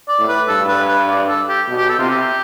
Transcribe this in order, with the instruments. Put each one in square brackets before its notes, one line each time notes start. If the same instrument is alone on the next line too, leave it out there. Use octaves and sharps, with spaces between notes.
[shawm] D5
[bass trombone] A2
[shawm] B4
[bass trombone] G2 [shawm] A4
[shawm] B4
B4
D5
A4
G4
[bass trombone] B2
[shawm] G4
A4
[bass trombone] C3 [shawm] F4
[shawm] G4